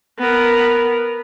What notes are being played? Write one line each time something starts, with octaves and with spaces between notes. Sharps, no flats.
B3 A#4